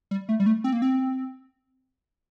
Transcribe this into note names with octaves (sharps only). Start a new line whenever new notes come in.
G3
A3
G3
A3
C4
A#3
C4